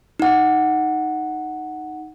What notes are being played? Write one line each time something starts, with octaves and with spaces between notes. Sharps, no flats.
D#4 F#5